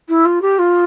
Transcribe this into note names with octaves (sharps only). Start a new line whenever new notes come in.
E4
F4
G4
F4